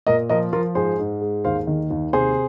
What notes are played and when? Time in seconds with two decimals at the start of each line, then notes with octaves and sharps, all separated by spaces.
0.07 A#2 A#4 D#5
0.29 F3 A#4 D#5
0.53 F3 F4 A#4
0.75 G#2 G#4 C5
0.99 G#2
1.21 G#3
1.44 D#2 C5 F5
1.67 D#3
1.90 D#2
2.13 C3 G#4 C5